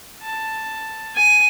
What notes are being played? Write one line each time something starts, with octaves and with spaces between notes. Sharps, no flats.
A5
G#5